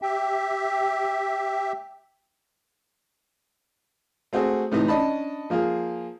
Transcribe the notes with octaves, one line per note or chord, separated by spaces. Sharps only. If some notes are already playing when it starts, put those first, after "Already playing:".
G4 E5 G5
A3 C4 F#4 G#4
A2 C3 E3 D#4
C#4 D4 D#5 A5 B5
F3 A#3 F4 G#4